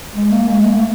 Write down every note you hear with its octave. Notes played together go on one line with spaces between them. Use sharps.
G#3
A#3
G#3
A#3
A3